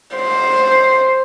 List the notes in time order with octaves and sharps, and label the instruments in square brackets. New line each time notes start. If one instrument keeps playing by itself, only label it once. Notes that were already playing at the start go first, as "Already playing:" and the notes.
[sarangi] C5